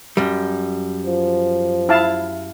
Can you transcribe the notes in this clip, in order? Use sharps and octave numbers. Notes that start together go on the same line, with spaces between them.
F#2 G3
F3
E4 F5 A5